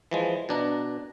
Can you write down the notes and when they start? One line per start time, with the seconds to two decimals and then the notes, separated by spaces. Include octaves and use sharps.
0.11 E3 F3 G#3
0.49 B2 D4 A#5